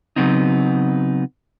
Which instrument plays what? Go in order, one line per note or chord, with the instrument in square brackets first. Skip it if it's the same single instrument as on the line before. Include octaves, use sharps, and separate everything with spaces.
[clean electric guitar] C#3 F#3 B3 C4 D#4